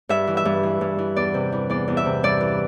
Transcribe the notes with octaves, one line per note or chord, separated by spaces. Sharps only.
G2 E5
E3
E5
G2
E3
G2
E3
E2 D5
C3
E3
E2 D5
E2
E5
C3
G2 D5
E3